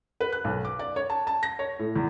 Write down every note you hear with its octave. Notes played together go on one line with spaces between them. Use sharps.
B4
F#6
B1
D6
D5
C#5
A5
A5
A#6
C#5
A2
E2